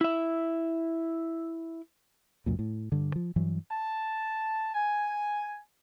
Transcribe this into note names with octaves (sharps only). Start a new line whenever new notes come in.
E4 E5
C#2 F#2 A#2
A2
G2 D3
F3
G2 E3 F#3
A5
G#5